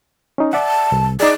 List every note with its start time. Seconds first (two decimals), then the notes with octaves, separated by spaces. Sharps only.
0.38 C#4 D#4
0.53 D5 E5 F#5 A5
0.92 C2
1.20 D#4 G#4 D5